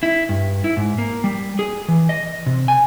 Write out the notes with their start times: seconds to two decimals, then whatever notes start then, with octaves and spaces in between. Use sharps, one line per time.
0.03 E4
0.29 G2
0.64 E4
0.77 G#2
0.98 A#3
1.24 G3
1.59 G#4
1.88 E3
2.09 D#5
2.46 C3
2.68 G#5